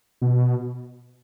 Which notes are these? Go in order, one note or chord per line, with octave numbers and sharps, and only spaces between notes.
B2